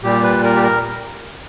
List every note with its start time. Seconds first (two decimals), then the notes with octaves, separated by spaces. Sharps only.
0.03 A#2 G3 G4
0.23 B4
0.44 A#4
0.56 G4
0.63 A#4